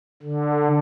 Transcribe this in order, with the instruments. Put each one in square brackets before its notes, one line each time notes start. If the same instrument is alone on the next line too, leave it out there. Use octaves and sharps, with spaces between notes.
[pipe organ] D3